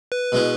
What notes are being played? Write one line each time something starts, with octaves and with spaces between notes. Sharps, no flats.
B4
B2 G#3 C#4 E4